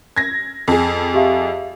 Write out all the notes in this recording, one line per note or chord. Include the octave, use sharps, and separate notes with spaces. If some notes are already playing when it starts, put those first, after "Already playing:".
G#6 A#6
F2 G#4
G4 E5 F5